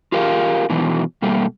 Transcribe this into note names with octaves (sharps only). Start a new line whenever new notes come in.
F4 G4 G#4 A#4 E5 F5
B2 D#3 E3 F#3
B2 G3 A3 A#3